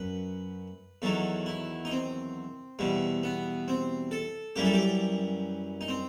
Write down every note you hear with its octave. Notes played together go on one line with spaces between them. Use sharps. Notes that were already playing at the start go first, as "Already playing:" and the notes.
Already playing: F#2 B4
E2 D#3 F#3 A4
E4
D#4
C4
E2 B2 G3
B3
C4
A4
F#2 E3 G3 G4
A4
G4
D#4
C4